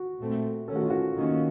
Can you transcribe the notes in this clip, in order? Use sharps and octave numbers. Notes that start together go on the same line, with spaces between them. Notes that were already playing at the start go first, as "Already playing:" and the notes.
Already playing: F#4
A#2 A3 C4
D#3 A3 C#4 A4
F#4
F4
F#4
D#3 A#3 C#4